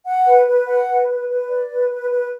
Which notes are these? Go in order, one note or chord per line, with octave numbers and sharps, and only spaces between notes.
F#5
B4
B4
F#5
B4
B4
B4
D5
B4
B4
B4